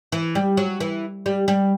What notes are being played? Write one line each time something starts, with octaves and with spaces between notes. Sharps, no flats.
E3
G3
F#3
E3
G3
G3